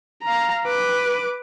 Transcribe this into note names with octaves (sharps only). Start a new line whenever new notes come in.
F5 A#5
B4 D6